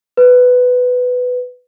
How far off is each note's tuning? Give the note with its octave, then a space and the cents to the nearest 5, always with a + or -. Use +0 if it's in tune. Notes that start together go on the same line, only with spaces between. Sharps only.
B4 +10